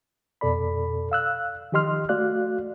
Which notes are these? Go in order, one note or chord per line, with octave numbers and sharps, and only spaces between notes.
F2 B2 A4 D5 B5
F5 E6 F#6
D#3 F3 G4 D#5 C6 F6
A3 F#4 D5 F5 F#6